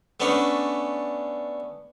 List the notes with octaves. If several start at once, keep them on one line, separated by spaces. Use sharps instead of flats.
A3 B3 C#4 D4